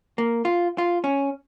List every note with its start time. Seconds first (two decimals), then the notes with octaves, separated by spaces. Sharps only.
0.18 A#3
0.45 F4
0.78 F4
1.04 C#4